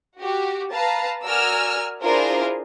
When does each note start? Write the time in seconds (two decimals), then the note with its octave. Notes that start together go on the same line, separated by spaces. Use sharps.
0.17 F#4 G4
0.71 B4 F5 A5 A#5
1.24 F#4 A#4 D5 G#5 E6 F6
2.01 D4 E4 F4 G#4 A#4 C5